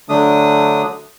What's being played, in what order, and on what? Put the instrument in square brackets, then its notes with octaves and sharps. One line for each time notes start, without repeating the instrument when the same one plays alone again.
[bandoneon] D3 F#3 A3 D4 D#6